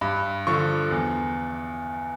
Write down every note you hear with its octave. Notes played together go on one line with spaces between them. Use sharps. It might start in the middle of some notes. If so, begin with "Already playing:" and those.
G2 B5
D3 F3 C#6
E2